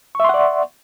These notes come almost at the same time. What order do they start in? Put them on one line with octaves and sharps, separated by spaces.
C#6 E5 C6 F#5 D5